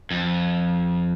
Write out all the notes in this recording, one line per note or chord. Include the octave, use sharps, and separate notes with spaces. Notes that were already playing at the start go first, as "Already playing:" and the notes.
F2